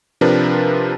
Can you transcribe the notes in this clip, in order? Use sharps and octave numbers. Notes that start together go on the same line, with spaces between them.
C3 F3 D4 A#4 B4